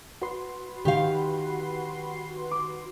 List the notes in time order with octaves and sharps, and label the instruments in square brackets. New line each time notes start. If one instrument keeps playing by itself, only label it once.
[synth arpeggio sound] F#4 B4 C6
[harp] D#3 [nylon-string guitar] G4 F5
[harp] D6